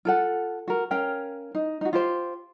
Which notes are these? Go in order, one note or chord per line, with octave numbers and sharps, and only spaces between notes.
F4 A4 F#5
F#4 A#4
C#4 A#4 F5 G5
D#4
D#4 F#4
F4 G4 C5